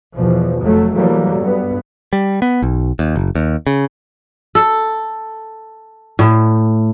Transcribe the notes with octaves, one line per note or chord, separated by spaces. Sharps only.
E2 B2 F3
F1 F#3 A3
E3 F#3 G3 A3 A#3
G2 B3
G3
B3
B1
D#2
F#1
D#2
C#3
A4
A2